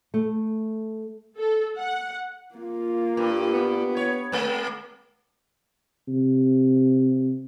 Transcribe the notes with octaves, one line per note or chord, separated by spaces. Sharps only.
A3
A4
F#5
A#3 F4
G2
B3
C#5
G#3 A#3
C3